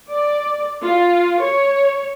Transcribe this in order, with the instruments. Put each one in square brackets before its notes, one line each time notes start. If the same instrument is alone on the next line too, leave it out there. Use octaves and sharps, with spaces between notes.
[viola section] D5
F4
C#5